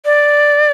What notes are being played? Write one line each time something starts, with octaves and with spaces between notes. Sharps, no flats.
D5